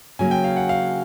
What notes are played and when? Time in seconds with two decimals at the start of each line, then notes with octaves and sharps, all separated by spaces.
0.19 C#3 F#3 A#3 G#5
0.31 G5
0.44 F5
0.56 F#5
0.69 F5